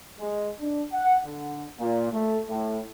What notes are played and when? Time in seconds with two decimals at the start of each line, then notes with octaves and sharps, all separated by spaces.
0.19 G#3
0.60 D4
0.92 F#5
1.26 D3
1.79 A#2
2.12 A3
2.48 A2